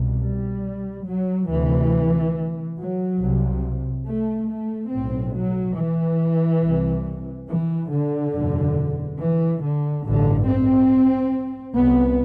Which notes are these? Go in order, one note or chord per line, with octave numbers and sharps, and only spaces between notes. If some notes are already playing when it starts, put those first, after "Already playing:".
Already playing: C2 B2
G3
F#3
D2 C3 E3
F#3
C2 C3
A3
A3
B1 A2 C4
F#3
E3
C2 C3
E3
D3
F#1 E2 B2
E3
D3
A1 G2 D3
C4
C2 C3 B3